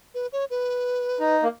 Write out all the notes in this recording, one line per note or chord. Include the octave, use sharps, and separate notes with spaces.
B4
C#5
B4
D#4
A#3